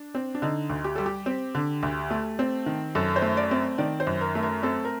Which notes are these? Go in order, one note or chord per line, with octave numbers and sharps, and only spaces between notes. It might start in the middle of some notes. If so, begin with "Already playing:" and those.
Already playing: D4
C4
D4
D3 D#4
D2
G4
G3 A4
G4
C4
D3
D2
A3
C4
D#3
F#2 A4
C5
A3
D5
C4
D#3 D5
C5
F#2
A#4
A3
A#4
C4 A4
A#4